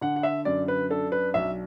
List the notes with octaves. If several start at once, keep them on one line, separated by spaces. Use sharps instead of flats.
D3 F#5
F#5
E5
F#2 D5
B4
D4 A4
B4
B1 E5